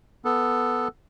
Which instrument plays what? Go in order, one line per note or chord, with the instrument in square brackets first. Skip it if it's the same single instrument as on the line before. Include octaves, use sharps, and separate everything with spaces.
[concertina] B3 A4